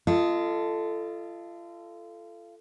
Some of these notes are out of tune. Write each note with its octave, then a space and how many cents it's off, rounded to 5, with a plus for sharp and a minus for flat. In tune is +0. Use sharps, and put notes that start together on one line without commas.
F4 -30 A4 +0 D#5 +0